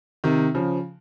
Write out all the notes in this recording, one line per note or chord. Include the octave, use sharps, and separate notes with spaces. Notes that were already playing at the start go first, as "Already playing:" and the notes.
C3 D#3
C#3 F3